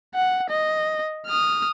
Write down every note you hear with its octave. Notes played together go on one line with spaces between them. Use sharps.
F#5
D#5
D#6 F6